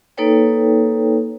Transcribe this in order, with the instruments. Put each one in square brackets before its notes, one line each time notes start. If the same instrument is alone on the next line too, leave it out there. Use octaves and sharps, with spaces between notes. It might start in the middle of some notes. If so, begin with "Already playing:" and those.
[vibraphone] A#3 D#4 A4 B4 C#5 G5